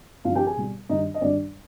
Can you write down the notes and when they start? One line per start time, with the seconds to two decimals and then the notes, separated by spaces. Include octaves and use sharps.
0.24 G2 F4 F5
0.29 F3
0.35 G4 G5
0.46 G#4 G#5
0.57 B2 G3
0.89 G2 D#3 G3 D#4 D#5
1.14 D#5
1.21 G2 D#3 G3 D4 D5